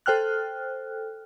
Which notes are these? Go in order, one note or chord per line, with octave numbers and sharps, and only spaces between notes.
A4 C5 G5 F6 F#6